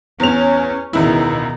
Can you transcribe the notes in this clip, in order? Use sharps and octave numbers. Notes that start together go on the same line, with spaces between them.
E2 C#4 F7
E1 C#2 B2 D#3 E4